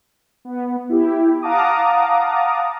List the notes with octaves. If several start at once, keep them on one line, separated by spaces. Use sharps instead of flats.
B3
E4 G4
F5 F#5 A5 A#5 D6 D#6